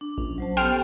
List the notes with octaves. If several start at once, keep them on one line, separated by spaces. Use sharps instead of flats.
D4
A#1 C#4
F#3 C5 A5
B3 G4 A4 C5 G5 F6